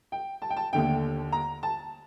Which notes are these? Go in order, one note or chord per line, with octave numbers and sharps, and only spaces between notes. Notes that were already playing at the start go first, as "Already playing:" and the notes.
G5
A5
G5
A5
D#2 D3 A3 G5
A#5
A5